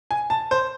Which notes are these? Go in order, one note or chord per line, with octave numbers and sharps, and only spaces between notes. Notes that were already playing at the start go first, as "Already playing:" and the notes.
G#5
A5
C5